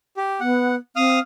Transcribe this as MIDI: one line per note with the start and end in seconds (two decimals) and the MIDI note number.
0.17 0.40 67
0.40 0.76 59
0.40 0.75 78
0.96 1.19 60
0.96 1.19 77
0.96 1.19 87
0.96 1.19 89